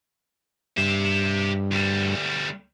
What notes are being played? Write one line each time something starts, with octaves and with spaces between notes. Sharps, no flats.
G2 G4 E5
D2 G3